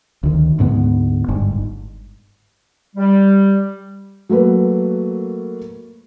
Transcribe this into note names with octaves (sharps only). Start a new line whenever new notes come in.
D2 D#3
D2 G#2 A#3 B3
G1 G#2
G3
F#3 A3 A#3 B4